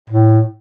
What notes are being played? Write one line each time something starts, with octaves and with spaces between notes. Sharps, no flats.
A2